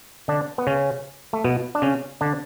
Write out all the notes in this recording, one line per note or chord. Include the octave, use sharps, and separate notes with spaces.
D3 D4
B3
C#3 C#4
A3
B2 B3
D4
C#3 C#4
D3 D4